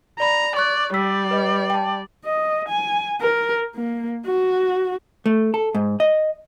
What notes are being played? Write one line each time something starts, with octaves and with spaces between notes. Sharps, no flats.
D5 A#5 B5
D5 C#6 F#6
G3 D5 E6 B6
B4 D#5
G5 A5
D#5
G#5
A#4
A#3
F#4
A3
A4
G#2
D#5